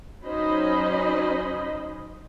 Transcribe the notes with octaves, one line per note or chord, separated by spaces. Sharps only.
F#3 C#4 D#4 C5 D#5 B5